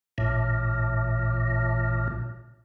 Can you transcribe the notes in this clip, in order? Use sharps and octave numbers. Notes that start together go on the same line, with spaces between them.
A1 A#2